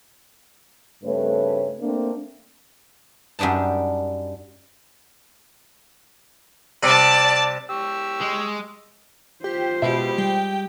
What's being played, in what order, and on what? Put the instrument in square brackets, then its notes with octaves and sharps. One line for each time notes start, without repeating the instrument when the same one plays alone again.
[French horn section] G2 C#3 A3 C4 B4 C#5
A3 A#3 C4 D4
[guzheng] F#2 G3 D4 D#4 A5
[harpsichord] C3 G3 D4 [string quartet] D5 A5
[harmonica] G4 C#6 E6
[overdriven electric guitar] G#3
[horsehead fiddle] F4 C5 [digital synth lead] G4
[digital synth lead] B2 [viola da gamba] G#3 G4 [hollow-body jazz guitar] F#4 B4 E5
[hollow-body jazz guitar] G3 [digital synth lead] G5